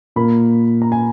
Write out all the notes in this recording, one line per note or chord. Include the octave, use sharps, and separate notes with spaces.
A#2 A#3 B5
A#5
G#5